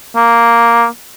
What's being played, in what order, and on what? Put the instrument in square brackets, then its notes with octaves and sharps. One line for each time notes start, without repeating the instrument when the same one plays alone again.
[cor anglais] A#3